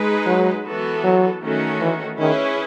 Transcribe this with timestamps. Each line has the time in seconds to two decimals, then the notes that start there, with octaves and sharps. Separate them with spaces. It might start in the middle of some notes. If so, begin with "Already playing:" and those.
Already playing: G#3 D#4 G#4 B4
0.26 F#3
0.66 E3 B3 F#4 A4
1.04 F#3
1.42 D#3 A3 C#4 F#4
1.81 E3
2.18 D#3 C#4 E4 G#4 B4